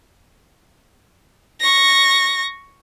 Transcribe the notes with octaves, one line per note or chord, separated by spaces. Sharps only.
C#6 A#6